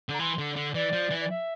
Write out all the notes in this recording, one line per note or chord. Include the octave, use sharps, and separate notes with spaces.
D3 A#5
E3 C6
D3
D3
E3 D5
F3
E3
D5
E5